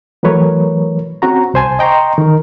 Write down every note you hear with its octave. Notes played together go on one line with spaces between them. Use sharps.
E3 F#3 A3 A#4 B4 C#5
C4 C#4 F#4 A#5
C2 C5 G#5 A5
D#5 G5 A#5 C6 C#6
D#3 A#4